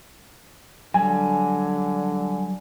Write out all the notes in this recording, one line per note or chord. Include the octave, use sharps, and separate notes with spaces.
D3 F#3 G3 G#5